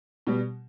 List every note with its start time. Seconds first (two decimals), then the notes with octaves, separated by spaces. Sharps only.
0.27 B2 G3